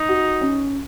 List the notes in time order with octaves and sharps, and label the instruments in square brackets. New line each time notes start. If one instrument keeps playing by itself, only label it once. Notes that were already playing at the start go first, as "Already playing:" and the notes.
Already playing: [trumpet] D#4
[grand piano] F#4
C#4